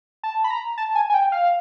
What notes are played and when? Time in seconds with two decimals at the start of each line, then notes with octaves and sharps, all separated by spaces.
0.23 A5
0.44 B5
0.50 A#5
0.78 A5
0.95 G#5
1.10 G#5
1.14 G5
1.32 F5